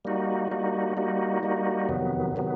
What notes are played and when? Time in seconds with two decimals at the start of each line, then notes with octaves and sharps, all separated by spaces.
0.05 G3 A#3 D#4 F#4
0.51 G3 A#3 D#4 F#4
0.97 G3 A#3 D#4 F#4
1.43 G3 A#3 D#4 F#4
1.89 F2 C3 D#3 F#3 B3
2.36 C3 D#3 F#3 B3